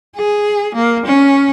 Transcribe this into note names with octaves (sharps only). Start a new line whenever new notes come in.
G#4
A#3
C#4